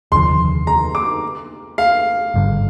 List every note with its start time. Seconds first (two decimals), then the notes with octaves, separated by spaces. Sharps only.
0.12 F1 D#2 D3 F3 C6
0.67 A#5
0.95 D6
1.78 F5
2.34 G#1 G2 D3